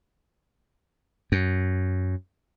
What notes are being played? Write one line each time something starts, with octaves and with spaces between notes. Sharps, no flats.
F#2